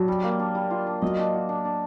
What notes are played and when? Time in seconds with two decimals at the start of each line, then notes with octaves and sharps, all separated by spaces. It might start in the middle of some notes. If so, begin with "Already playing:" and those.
Already playing: F#3 D4 G4 B4
0.08 G3
0.24 A#3
0.39 D4
0.55 G3
0.71 F4
0.87 D4
1.02 F#3 D#5
1.19 D4
1.34 F#4
1.49 D4
1.65 D4